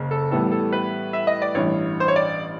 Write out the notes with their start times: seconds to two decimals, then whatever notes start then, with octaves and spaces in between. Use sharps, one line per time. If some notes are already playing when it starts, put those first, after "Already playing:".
Already playing: F#1 C#3
0.11 A4
0.31 A2 E3 G3 B3 A4
0.52 A4
0.73 B4
1.13 E5
1.27 D#5
1.42 D5
1.55 A1 G2 E3 C#5
2.00 C5
2.08 C#5
2.16 D5